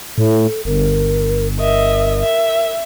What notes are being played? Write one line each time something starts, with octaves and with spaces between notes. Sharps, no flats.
A2 A4
G1 A#4
A#4 D#5 E5
E5